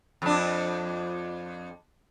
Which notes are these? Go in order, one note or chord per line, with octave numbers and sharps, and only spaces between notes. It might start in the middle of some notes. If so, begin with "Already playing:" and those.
F2 D4